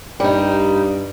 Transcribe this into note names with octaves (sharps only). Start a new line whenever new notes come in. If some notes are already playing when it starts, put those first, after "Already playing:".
G2 G3 D#4